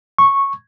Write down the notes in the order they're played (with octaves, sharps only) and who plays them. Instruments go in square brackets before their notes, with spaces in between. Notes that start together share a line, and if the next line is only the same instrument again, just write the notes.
[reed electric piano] C#6